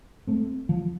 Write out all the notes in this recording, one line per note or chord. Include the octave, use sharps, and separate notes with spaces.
A3 C4
F3